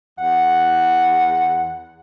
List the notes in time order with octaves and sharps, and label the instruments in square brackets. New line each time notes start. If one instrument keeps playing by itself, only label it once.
[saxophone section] E2 F#5